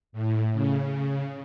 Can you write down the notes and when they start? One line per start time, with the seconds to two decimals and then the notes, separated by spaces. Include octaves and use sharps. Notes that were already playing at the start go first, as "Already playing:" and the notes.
0.12 A2
0.53 C#3